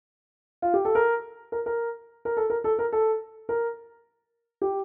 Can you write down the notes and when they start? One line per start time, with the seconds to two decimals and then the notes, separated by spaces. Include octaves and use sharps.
0.62 F4
0.74 G4
0.85 A4
0.95 A#4
1.52 A#4
1.66 A#4
2.25 A#4
2.37 A4
2.50 A#4
2.64 A4
2.79 A#4
2.92 A4
3.49 A#4
4.62 G4